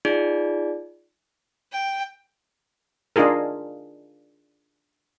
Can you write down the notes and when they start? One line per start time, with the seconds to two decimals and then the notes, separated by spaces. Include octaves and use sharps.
0.05 D#4 F4 G#4 D5
1.72 G5
3.16 D4 D#4 F4 G#4 A#4